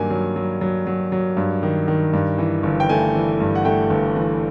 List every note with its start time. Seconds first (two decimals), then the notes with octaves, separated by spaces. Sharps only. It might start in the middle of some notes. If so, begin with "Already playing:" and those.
Already playing: G2 D#3 F#3 A#3 G#5
0.10 F#3
0.36 F#3
0.61 F#3
0.87 F#3
1.12 F#3
1.37 G2
1.63 D#3
1.88 D#3
2.13 G2
2.38 E3
2.63 G1
2.80 G5
2.89 A3 G#5
3.15 E3
3.40 G2
3.55 F#5
3.65 A3 G5
3.90 G1
4.16 E3